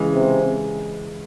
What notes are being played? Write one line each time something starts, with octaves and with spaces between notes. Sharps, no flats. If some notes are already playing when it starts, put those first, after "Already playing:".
Already playing: C#3 E3 G#3
C3